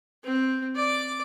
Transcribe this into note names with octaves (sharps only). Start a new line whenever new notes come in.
C4
D5 D6